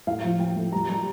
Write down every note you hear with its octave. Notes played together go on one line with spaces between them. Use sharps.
A2 F5
F3
A2 G5
A3
G3 A#5
G3 A#5